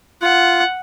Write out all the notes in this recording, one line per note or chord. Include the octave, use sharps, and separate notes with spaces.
F4 F#5